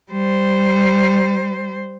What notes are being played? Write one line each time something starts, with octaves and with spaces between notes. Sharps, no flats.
G3 C5